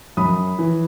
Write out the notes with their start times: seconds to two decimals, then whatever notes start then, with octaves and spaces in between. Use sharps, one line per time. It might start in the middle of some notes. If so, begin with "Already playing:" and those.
0.17 F#2 B5 D#6
0.59 E3